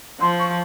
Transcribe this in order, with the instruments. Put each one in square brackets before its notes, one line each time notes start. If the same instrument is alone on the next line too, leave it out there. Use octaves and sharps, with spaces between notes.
[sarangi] F3 [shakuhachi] C6
[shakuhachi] C#6